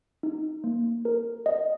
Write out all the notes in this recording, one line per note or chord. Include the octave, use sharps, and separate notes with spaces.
D#4
A#3
A#4
D#5